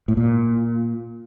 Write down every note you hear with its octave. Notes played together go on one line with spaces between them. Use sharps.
A2
A#2